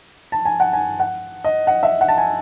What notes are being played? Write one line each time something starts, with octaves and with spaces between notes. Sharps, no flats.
A5
G#5
F#5
G#5
F#5
D#5
F#5
E5
F#5
A5
G#5